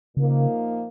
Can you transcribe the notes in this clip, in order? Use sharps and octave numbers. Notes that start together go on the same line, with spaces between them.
A#2 C#3 F3 A#3 D#4